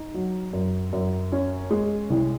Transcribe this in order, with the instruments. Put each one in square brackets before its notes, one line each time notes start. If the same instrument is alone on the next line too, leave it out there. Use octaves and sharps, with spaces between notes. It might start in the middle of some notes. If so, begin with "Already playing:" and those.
Already playing: [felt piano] D#4
F#3
F#2
F#2
C#4
G#3
C2